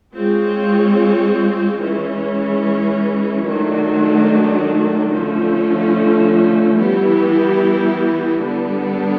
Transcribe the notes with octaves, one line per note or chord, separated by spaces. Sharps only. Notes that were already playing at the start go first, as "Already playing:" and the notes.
G#3 C4 F4 G#4 C#5
E3 G#3 C#4
D#3 F#3 A3 D4 F#4
D3 F3 A3 C#4
E3 G3 B3 E4 G4
D3 G3 B3 D4